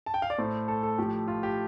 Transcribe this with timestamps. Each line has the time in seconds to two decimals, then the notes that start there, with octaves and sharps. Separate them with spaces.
0.06 A5
0.14 G5
0.22 F5
0.30 D5
0.38 A2 A3 C5
0.68 A4
0.83 A4
0.98 A2 F3 A3 G4
1.28 F4
1.43 G4